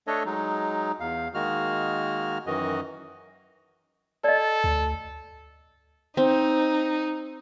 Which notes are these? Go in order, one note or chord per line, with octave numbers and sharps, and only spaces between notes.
A3 D4 A4 C#5 D#5
F#3 G#3 D#4
E2 F5
D#3 G#3 A#3 F#4 F6
F#2 D#3 E3 F#4 D#5
A4 D5 D#5
D2
C4 D#4